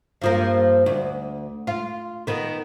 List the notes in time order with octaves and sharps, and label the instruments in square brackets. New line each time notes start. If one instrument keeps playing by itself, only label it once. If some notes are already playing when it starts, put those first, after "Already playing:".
[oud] G2 F3 A#3
D2
F4
D#3 B3